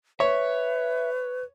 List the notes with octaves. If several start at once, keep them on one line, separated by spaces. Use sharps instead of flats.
B4 C#5 E5